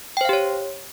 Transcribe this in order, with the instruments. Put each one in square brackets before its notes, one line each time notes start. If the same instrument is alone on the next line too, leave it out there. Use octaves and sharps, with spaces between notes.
[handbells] G5
C5
F5
G4
C#5